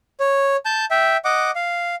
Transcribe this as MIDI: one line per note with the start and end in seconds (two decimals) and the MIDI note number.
0.20 0.56 73
0.65 0.85 81
0.65 0.85 91
0.91 1.17 76
0.91 1.17 79
1.25 1.51 75
1.25 1.51 78
1.25 1.51 86
1.55 1.95 77